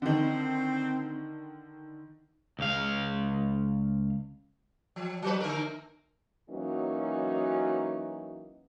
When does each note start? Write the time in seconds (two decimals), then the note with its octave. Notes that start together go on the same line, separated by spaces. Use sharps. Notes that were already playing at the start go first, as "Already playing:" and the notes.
0.02 D3 D#3 C4
2.59 C#2 F5
4.96 F3
5.22 F#3 B4
5.40 D3 A#3 A#4
6.50 E3 F#3 A#3 C#4 D#4 F#4